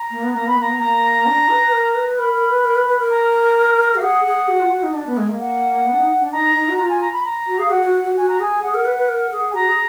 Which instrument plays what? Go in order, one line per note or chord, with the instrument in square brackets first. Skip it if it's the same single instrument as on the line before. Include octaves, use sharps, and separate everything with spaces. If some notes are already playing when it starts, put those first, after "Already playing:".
Already playing: [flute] A#5
[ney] A#3
B3
[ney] A#3 [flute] A#5
[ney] B3 [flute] B5
[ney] A#3 [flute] A#5
[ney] B3
[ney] A#3 [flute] A#5
[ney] D4
B4
B4
A#4
B4
[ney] A#4 [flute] B5
[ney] A#4
B4
A#4
B4
B4
A#4
[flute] A#5
[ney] F#4 [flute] F5
[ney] G#4 [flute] F#5
[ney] G#4
F#4
F4
F#4
D#4
D4
B3
G#3
A#3
[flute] F#5
[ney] B3
D4
D#4
D4
[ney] D#4 [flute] A#5
[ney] D#4
F#4
[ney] F4 [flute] A#5
[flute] G#5
A#5
B5
A#5
[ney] F#4
[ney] G#4 [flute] F5
[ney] F#4 [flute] F#5
[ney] F#4
F#4
[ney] F#4 [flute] G#5
[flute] A#5
[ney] G#4 [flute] G#5
[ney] G#4 [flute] F#5
[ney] A#4
B4
B4
A#4
G#4
[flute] G#5
[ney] F#4 [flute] A#5
[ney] G#4